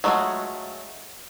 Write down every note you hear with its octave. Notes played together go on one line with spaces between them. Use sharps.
F#3 G#3 A3 F4 F#4